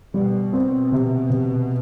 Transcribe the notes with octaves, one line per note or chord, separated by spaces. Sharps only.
B2 G3
C4
C3
C3